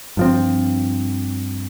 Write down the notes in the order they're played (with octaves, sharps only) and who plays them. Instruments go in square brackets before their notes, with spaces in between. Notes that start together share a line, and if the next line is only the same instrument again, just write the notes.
[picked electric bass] G2 F3 C4